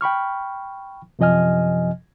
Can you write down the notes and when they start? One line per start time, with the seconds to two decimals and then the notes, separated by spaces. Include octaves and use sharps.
0.01 G5 B5 C#6 F6
1.19 F#2 C3 F3 D#5 G#5 F6